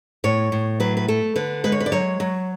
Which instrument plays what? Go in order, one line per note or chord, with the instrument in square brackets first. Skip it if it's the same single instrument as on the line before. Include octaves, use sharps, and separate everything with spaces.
[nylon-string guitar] A2 C#5
A2
F#3 B4
B4
A3 A4
D3 B4
G#3 B4
C#5
B4
D5
F#3 C#5
F#3